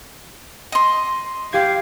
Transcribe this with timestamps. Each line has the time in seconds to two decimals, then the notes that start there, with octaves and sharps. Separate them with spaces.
0.72 D#5 C6
1.53 G4 F5 G#6